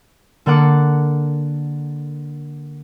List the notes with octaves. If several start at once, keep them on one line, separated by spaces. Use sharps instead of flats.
D3 A#3 A4 F#5 D6